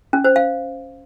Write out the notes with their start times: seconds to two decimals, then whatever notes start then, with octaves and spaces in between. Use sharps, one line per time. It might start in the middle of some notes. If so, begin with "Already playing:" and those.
0.13 C#4
0.24 C5
0.36 F5